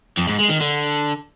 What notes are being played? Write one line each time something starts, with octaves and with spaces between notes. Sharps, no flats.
F2
G#2
G#3
D#3
D3